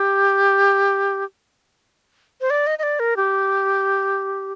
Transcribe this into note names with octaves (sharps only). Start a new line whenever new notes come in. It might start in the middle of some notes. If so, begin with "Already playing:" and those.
Already playing: G4
C5
D5
D#5
D#5
D5
A#4
G4